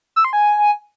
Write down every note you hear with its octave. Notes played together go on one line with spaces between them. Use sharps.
E6
C6
G#5